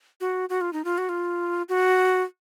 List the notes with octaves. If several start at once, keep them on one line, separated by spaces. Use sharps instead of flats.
F#4
F#4
F4
D#4
F4
F#4
F4
F#4